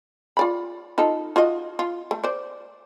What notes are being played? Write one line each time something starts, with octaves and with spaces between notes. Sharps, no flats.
F4 D5 B5
D#4 F4 A4
F4 F#4 D#5
F4
A3
C5 D5